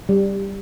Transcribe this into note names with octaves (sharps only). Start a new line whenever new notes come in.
G3